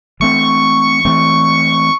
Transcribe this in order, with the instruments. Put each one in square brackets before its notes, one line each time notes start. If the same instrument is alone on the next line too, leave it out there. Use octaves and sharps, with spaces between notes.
[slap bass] E3 A3 C4 [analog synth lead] C#6
[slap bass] E3 A3 C4